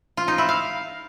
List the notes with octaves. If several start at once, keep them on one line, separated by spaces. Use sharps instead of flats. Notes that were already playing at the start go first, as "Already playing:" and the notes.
F4
D#4
E4
F5